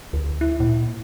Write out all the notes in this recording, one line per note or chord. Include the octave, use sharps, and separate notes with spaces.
D2
E4
A#2